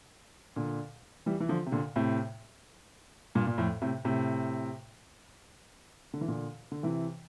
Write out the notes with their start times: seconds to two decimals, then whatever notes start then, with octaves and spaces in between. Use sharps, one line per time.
0.56 A#2 D3
1.26 E3 G3
1.40 E3
1.49 D3 F3
1.66 C3
1.72 A#2 D3
1.96 A2 C3
3.35 G2 A#2
3.47 A#2
3.58 F2 A2
3.82 A2 C3
4.05 A2 C3
6.14 D3
6.21 E3
6.28 A#2 D3
6.72 D3
6.83 C3 E3